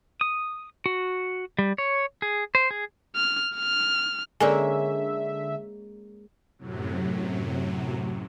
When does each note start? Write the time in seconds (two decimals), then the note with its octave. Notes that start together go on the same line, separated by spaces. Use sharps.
0.21 D#6
0.86 F#4
1.59 G3
1.78 C#5
2.22 G#4
2.55 C5
2.71 G#4
3.16 F6
3.57 F6
4.40 D3 G#3 A#3 C#4 A4 D5 E5 G#5
6.59 F#2 A2 C3 F#3